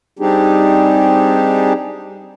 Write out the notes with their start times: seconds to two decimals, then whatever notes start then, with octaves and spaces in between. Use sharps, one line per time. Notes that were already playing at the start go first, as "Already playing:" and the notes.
0.19 G3 C4 D4 D#4 G4 G#4